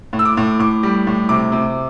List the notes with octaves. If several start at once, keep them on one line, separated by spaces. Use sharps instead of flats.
A2
E6
D6
A2
A2 D6
G3
A2
C3 D6
C3